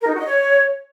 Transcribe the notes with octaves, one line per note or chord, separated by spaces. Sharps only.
A#4
D#4
F#4
D#5
C#5